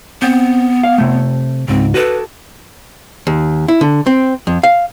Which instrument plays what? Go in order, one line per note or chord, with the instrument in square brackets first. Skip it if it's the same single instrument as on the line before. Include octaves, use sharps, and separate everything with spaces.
[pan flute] B3 [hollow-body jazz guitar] C4
[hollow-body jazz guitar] F5
C3 A3
[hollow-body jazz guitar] C#2 G#2 [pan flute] C4
[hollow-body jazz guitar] F#4 A4 [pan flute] B4
[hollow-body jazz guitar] D#2
E4
D3
C4
F2
F5